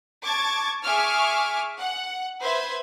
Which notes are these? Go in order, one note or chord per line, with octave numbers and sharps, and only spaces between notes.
A5 C#6 D6 G#6 A6
G#4 E5 G#5 C#6 D6 F6
F#5
B4 C5 E5 C6 G#6